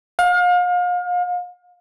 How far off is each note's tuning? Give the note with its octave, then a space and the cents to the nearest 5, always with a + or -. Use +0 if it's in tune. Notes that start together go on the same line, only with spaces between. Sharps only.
F5 +35